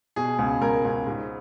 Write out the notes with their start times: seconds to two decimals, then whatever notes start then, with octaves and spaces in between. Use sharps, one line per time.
0.16 B2 G#4
0.39 C#2
0.61 C#2 A#4
0.85 C#2
1.07 G#2